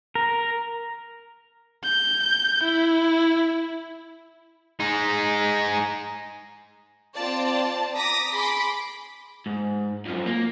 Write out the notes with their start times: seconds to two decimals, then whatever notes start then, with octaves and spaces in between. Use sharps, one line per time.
0.15 A#4
1.84 G6
2.64 E4
4.80 G#3 D#4
7.15 C4 F4 D5 A5
7.94 A#5 D6 D#6 A#6 B6
8.33 G#4 B5 C6 D6 B6
9.46 G#2
10.05 F#2 F3
10.26 A#3